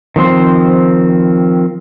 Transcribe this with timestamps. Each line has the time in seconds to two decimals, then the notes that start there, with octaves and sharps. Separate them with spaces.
0.16 D#3 F3 C4 C6